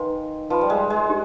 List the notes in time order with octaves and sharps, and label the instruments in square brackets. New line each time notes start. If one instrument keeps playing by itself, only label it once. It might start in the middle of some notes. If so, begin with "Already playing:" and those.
Already playing: [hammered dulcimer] D#3 [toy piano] B4 F5 G#5 C6
[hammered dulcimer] F3 [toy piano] B4 F5 B5
[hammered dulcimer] G3
G#3
G#3
[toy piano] D4 G4